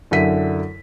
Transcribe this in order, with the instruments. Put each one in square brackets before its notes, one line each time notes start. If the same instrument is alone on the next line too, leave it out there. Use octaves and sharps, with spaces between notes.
[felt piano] F#2 D3 E4 B6 D#7